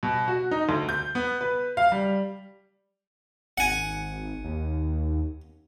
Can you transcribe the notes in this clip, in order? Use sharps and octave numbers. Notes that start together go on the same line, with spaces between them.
B2
F#4
D#4
D2
G6
B3
B4
F5
G3
G#1 F#5 G#5
D#2